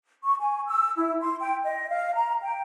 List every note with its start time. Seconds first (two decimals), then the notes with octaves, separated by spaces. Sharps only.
0.23 C#6
0.40 G#5
0.66 E6
0.97 E4
1.22 C6
1.41 G5
1.65 D#5
1.90 F5
2.16 A#5
2.42 G5